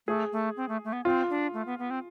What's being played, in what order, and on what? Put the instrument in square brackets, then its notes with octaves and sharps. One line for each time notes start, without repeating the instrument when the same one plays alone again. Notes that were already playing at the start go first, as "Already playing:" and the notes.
[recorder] A3 [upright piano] G#4
[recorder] A3
C4
A3
A3
B3
[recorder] C4 [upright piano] F4
[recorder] D4
A3
B3
B3
C4